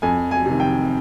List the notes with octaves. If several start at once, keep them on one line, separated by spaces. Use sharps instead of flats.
F2 G#5
G#5
C3 D#3
G5